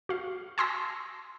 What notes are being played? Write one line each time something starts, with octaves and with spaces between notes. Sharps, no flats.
F#4 F5
G#5 A5 C6 D#6 E6 A#6